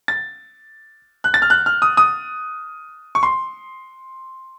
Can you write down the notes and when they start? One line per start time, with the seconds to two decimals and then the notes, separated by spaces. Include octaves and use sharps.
0.08 A6
1.24 F#6
1.34 A6
1.42 F6
1.50 F#6
1.66 F6
1.82 D#6
1.97 D#6
3.15 C#6
3.23 C6